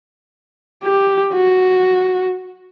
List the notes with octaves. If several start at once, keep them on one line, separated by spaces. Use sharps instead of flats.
G4
F#4